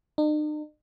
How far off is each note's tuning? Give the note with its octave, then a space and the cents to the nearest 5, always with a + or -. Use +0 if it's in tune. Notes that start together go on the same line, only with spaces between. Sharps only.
D#4 -45